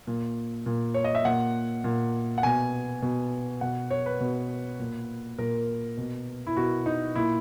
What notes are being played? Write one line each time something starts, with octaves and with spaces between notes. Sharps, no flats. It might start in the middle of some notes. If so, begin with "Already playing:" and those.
A#2
A#2
C#5
D#5
E5
A#2 F#5
A#2
F#5
B2 G#5
B2
B2 F#5
C#5
B4
B2
A#2
A#2 A#4
B2
E4
B2 F#4
D#4
A#2 E4